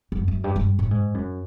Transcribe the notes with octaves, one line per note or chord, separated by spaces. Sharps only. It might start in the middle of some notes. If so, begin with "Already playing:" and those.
F#2
F#2
G2
G2
A2
G#2
F#2